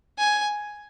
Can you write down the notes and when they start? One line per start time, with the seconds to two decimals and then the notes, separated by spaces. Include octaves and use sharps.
0.18 G#5